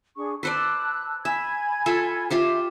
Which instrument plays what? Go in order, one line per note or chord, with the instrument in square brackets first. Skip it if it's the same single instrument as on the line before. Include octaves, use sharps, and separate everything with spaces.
[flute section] D4 G#4 C#6
[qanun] B4 C5 D5 [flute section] A5 E6 F#6
[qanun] E5 [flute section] G#5 B5 G#6
[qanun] F4 A4 E5
[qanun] F4 G4 C5 [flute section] E5